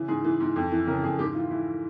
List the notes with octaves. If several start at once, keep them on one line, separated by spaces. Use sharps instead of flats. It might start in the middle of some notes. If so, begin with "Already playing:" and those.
Already playing: C#3 E3
G#2 G#4
E3
G#2
F2
E3
C#3 A#4
F2 G#4
G#2 G4
E3 F4
E3 E4